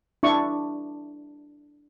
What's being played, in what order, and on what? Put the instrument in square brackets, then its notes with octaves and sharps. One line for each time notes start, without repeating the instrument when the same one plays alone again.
[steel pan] D4 E4 C#6